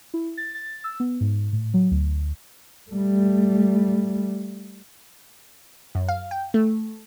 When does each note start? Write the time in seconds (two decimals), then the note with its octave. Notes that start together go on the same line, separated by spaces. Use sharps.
0.14 E4
0.37 A6
0.55 A6
0.84 E6
1.00 B3
1.21 G#2
1.53 A2
1.74 F#3
1.91 D2
2.91 G3 A3
5.95 F#2
6.09 F5
6.31 G5
6.54 A3